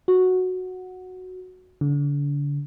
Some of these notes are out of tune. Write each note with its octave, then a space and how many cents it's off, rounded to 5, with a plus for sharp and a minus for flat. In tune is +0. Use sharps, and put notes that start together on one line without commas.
F#4 -5
D3 -35